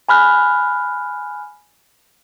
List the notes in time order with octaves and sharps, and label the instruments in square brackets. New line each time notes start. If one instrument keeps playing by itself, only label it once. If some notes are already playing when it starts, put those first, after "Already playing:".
[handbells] G#5 B5 F6 F#6